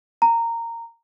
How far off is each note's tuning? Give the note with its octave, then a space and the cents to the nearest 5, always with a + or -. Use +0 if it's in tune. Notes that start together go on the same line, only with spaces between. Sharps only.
A#5 -15